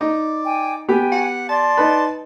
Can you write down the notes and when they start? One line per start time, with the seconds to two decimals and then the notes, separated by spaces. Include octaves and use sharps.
0.01 D#4 D5
0.44 G5 G#5
0.88 B3 G4 G5 G#5
1.12 F#5
1.49 D5 A5 C6
1.77 D#4 B4